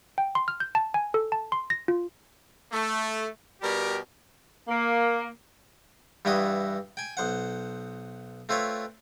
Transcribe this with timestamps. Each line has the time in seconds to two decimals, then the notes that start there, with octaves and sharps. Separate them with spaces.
0.18 G5
0.35 C6
0.48 F6
0.60 G6
0.75 A5
0.94 G#5
1.14 A4
1.32 A5
1.52 C6
1.70 A#6
1.88 F4
2.72 A3
3.60 B2 G3 G4 A#4
4.68 A#3
6.25 G2 E3 G3 E4 F#4 D#6
6.97 G5 G#5
7.17 B1 C5 F#5
8.49 A3 C4 F4 B4 C#5